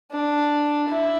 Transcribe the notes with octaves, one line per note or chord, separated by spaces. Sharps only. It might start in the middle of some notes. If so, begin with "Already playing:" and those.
D4
E4